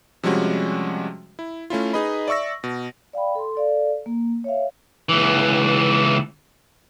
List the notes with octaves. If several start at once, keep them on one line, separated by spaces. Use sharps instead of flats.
C3 F3 G3 G#3 C#4 F#4
E4
A3 C#4 E4 F4
D#4 G#4 B4 D#5 B5
D5 E5 C#6 E6 A#6
B2
D5 F5 G5 B5
A4 C6
A4 D5 F5
A#3
C#5 E5 F5
C#2 E3